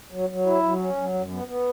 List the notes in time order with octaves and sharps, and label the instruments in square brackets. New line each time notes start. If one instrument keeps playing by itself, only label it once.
[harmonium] F#3
F#3
E4
F#3
C#4
F#3
F#2
B3
B3